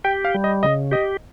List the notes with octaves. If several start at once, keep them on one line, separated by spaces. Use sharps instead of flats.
G4 G5
F5
G3
D#5
C#3 D#5
G4 D#5